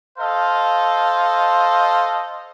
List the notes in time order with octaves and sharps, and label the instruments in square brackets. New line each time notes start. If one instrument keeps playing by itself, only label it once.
[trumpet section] A4 C5 D#5 F5